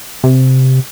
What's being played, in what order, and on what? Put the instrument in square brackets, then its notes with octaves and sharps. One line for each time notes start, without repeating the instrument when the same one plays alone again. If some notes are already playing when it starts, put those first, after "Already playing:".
[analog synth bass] C3